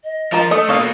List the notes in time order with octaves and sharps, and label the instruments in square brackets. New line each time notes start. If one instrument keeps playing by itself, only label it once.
[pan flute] D#5
[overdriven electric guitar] F3 [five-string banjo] F4 A#4
[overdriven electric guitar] A3 [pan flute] A4 [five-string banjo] D#5
[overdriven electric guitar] B2 A#3 [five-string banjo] C#5 D#5 F5